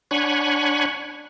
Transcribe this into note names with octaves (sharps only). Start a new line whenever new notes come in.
D4 C#5 F#5 G#5 B5 C#6